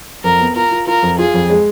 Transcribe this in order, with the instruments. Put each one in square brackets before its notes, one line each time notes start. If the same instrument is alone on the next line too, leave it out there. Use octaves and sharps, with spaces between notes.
[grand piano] F2 [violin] A#4
[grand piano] B3
[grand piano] F4 [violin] A#4
[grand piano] F4
[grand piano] F4 [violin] A#4
[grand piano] F2
[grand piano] F4 [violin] G#4
[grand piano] F2
G#3